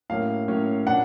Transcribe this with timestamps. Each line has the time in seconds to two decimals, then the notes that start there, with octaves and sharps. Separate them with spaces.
0.10 A2 F#3 A#3 C#4 F5
0.48 A2 F#3 A#3 C#4
0.86 A#2 F#3 A#3 D4 F#5